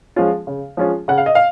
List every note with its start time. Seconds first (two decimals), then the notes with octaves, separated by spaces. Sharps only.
0.16 F3 G#3 C#4 F4
0.47 C#3
0.77 F3 G#3 C#4 F4
1.08 C#3 F#5
1.18 F5
1.26 D#5
1.35 F5